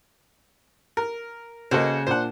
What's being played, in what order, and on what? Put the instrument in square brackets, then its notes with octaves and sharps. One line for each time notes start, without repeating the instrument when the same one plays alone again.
[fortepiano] A#4
[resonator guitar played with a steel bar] C#3 [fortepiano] A#3 F#4 C5 [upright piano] A4 D#5
[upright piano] A#2 D4 [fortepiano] C5 F#5